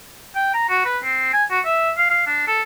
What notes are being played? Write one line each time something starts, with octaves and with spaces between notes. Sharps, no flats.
G5
A#5
F#4
B4
C4
G#5
F#4
E5
F5
F5
D4
A4